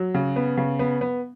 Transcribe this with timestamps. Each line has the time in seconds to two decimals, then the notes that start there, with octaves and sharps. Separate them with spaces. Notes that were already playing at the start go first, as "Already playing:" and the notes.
Already playing: F#3
0.14 C#3
0.36 B3
0.57 C#3
0.79 B3
1.01 B3